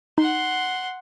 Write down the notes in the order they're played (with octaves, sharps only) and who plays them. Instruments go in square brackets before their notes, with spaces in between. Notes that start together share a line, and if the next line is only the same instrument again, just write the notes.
[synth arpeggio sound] D#4 [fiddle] F#5 C6